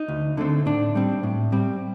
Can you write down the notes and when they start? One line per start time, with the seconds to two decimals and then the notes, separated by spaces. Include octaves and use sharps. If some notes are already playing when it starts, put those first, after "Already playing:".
Already playing: D#4
0.08 D2
0.37 D3 A3 C4
0.66 A2 D4
0.95 G3 C4
1.23 A2
1.52 G3 C4